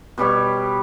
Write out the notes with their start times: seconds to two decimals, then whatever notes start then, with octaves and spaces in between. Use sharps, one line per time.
0.18 B2 G3 G4 C#5